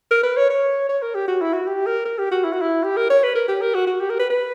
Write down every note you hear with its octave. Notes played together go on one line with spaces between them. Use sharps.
A#4
B4
C#5
C#5
C#5
A#4
G4
F#4
E4
F#4
G4
A#4
A#4
G4
F#4
E4
F#4
E4
G4
A#4
C#5
B4
A#4
G4
A#4
F#4
F#4
G4
A#4
B4
B4